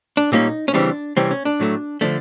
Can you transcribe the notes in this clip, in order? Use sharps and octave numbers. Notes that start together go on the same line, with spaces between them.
D4
A#2 G3 A#3 C#4 D#4
C#4
C#3 E3 G3 C4 D4
C3 E3 G3 C4 C#4
C#4
D4
A2 F#3 A3
D3 F3 A3 D4